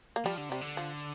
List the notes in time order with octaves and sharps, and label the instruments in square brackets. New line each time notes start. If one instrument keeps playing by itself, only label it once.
[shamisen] A#3
[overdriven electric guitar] F3 [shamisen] G3
[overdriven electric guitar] D3
[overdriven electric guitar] C3 [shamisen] G3
[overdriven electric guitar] D3
[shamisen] F3